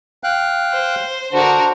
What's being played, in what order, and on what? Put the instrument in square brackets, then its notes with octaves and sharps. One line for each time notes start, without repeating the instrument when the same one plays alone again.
[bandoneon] F5 G5 F#6
[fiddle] C5
[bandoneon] D3 [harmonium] D4 C5 [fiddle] F#4 A#4